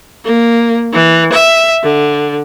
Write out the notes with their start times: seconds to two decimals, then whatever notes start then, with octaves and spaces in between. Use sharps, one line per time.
0.25 A#3
0.93 E3
1.33 E5
1.83 D3